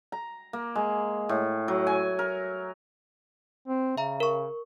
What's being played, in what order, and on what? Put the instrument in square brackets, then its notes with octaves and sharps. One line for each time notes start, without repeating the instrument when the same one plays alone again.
[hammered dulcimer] A#5
A#3
G#3
A2
F#3
G#5
A#4
[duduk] C4
[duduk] C#3 [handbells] E5 A#5
[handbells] A#4 C#6